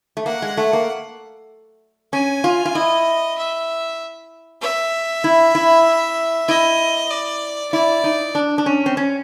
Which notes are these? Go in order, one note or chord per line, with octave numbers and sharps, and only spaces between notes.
A3
A#3 F#5
G#3
A3
A#3
C#4 G#5
F4
F4
E4 D#5
E5
E5
E4
E4
E4 D#5
D5
E4 D5
D#4
D4
D4
C#4
C4
C#4